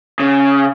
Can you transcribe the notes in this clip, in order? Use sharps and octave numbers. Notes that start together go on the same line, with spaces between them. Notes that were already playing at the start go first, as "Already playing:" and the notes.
C#3